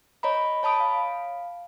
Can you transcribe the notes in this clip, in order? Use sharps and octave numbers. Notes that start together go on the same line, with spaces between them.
C#5 D#5 A#5 B5
C#5 A5 B5 D#6 D7
F5